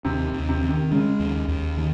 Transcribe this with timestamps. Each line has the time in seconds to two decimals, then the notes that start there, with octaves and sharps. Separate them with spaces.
0.05 D#2 C3
0.33 D#2
0.49 C3
0.62 D#3
0.69 C3
0.91 C#3 G#3
1.20 D#2
1.48 D#2
1.77 D#3